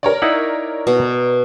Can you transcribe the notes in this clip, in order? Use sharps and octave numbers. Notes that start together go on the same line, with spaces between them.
A#4 C#5 D5
D#4 E4 F#5
B2